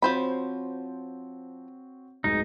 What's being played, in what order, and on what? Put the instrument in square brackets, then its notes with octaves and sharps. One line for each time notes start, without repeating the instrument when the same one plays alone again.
[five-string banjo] F3 C5 B5 [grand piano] C4 F#4 C#5
[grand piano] D1 G#3 [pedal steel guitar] D#4